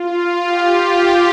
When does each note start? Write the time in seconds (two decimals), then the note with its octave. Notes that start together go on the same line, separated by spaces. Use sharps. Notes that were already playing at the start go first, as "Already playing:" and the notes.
Already playing: F4
0.44 G4